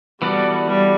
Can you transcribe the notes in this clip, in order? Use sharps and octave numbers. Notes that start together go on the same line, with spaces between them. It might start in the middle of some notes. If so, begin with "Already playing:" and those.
E3 G3 B3 F#4 A4 D5
G3